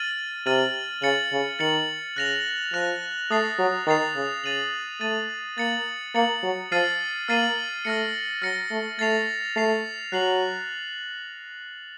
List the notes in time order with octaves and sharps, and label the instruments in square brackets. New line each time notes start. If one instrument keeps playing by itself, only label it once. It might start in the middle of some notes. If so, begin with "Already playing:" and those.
Already playing: [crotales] F6 A6 D#7 F#7
[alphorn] C3 [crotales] F6 A6 D#7 F#7
[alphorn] C#3 [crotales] A6 C#7 F#7
[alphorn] C#3
[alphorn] D#3 [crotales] A6 C#7 F#7
[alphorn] C#3 [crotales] F#6 A#6 F7
[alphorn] F3 [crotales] F#6 A#6 F7
[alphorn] A3 [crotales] D#6 A6 C7 F7
[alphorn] F#3
[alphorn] D#3 [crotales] D#6 A6 C7 F7
[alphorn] C#3
[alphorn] C#3 [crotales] A6 D#7 F#7
[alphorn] A3 [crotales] A6 D#7 F#7
[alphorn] A#3 [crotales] A6 C#7 F#7
[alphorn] A#3 [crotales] A6 C#7 F#7
[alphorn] F#3
[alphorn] F3 [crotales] F6 A6 C7 D#7 F#7
[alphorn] A#3 [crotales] F6 A6 C7 D#7 F#7
[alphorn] A3 [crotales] F6 A#6 C#7
[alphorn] F#3 [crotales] F6 A#6 C#7
[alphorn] A3
[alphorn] A3 [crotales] A6 C7 F7
[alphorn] A3 [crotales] A6 C7 F7
[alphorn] F#3 [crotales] F#6 C7 F#7